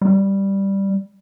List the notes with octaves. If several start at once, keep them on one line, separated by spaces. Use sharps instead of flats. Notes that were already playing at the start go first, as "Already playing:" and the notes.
G3